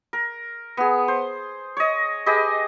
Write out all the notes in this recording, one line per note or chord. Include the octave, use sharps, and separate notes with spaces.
A#4
B3 G#4
C5
C#5 D#5
G4 G#4 B4 D#5